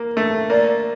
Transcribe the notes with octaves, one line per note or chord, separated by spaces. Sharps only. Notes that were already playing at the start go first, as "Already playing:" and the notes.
Already playing: A#3
A3
A#3 D5